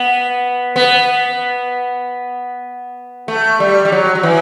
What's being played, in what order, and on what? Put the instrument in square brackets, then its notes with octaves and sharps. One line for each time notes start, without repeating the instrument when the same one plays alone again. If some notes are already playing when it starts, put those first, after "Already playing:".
Already playing: [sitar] B3
B3
A3
G3
G3
F#3
F#3
E3